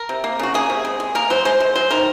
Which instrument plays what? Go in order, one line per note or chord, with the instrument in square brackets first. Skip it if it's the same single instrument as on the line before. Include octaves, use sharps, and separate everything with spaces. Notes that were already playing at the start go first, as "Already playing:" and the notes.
Already playing: [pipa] A#4
C3
A#3
C#3 F#4
A#3 G#4
C3
G#3
G#3
A#3 A#4
F#3 C5
G#3 C5
G#3
F#3 C5
D#3 A#4